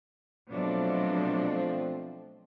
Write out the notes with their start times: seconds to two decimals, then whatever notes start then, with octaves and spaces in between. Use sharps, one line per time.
0.51 B2 F3 F#3 A3 C4 D4